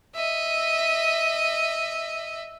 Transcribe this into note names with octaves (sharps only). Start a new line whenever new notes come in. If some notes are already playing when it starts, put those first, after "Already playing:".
D#5 E5